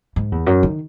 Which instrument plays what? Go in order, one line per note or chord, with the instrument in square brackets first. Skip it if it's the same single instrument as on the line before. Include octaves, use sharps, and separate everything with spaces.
[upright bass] G#2
E2
F#2
D#3